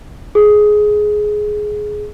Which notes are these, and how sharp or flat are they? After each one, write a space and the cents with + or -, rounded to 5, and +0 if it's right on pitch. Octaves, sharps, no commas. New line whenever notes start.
G#4 +10